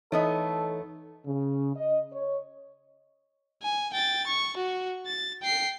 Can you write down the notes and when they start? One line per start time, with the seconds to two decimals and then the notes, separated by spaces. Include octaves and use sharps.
0.12 E3 A3 B3 D#4 A4 C#5 D#5
1.25 C#3
1.76 D#5
2.12 C#5
3.62 G#5
3.93 G5 A6
4.27 C#6
4.57 F#4
5.07 A6
5.43 G5 C7